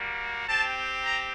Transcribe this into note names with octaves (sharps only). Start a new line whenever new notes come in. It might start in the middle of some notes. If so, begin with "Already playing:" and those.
Already playing: G3 A#3 F#4
C4 G4 A5
A#5